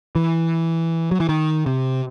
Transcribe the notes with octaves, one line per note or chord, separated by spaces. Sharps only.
E3
F#3
E3
D#3
C3